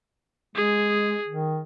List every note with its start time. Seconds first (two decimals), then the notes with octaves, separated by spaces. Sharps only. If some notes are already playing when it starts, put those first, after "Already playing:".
0.56 G#3 G#4
1.28 D#3